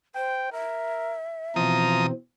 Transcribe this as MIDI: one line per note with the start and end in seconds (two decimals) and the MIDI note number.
0.15 0.50 72
0.15 0.52 79
0.52 1.16 70
0.52 2.01 76
1.56 2.11 47
1.56 2.11 52
1.56 2.06 53
1.56 2.11 60
1.56 2.06 82
1.56 2.06 87